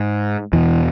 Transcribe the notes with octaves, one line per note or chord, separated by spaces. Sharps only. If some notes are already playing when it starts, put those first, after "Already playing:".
Already playing: G#2
E2 B2 E3